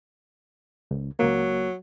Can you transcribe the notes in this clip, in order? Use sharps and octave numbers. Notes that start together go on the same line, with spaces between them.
C#2
C#2 F#3 A#3